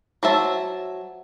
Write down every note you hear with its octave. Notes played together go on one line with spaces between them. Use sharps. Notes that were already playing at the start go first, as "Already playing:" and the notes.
F#3 C5 E5 A5